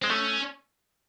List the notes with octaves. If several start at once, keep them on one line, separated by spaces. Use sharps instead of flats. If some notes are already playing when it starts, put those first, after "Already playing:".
G#3 C4
A3 C#4